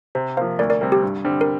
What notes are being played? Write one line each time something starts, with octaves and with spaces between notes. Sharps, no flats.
C3 G4 C5
F3 A#3 C5 F5
D2 A#4 D5
A#4 D5
C3 G3 C4 A#4
G4
G2
D3 G3 C4
A#4